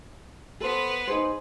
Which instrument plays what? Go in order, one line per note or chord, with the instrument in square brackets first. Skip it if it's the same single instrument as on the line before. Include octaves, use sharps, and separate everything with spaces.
[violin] B3 B4 [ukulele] A4 C5
[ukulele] D#4 G#4 C5